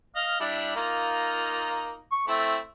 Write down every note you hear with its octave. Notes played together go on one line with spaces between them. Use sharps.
D#5 F5 F6
G3 D4 E4
A#3 D#4 F4
C#6
A3 C4 E4